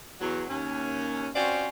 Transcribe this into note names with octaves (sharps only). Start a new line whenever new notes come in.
E2 F#3
D#2 C#4
C4 C#4 F4 F#4 C5 D5